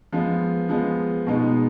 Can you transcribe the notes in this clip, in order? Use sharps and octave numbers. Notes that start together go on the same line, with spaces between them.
F3 G#3 B3
F3 G#3 B3
B2 G#3 B3 D#4